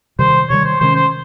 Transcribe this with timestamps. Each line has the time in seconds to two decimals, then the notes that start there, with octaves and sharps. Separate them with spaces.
0.19 C3 D#3 G3 C5
0.50 C3 D#3 G3 C#5
0.65 C5
0.80 C3 D#3 G#3 C#4 C5
0.96 C5